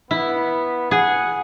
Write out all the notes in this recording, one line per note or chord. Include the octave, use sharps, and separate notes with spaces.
B3 E4
G#4 F#5